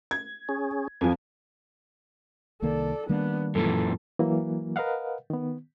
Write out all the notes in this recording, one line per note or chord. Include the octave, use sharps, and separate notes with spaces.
G#6
C#4 G#4
F2 F3 G#5
C2 D#3 A#3 A4 D5
D#3 G3 A#3 B3 D4
F#2 A#2 E3 A4
E3 F#3 A#3
A#4 B4 D#5 F5 F#5
D#3 B3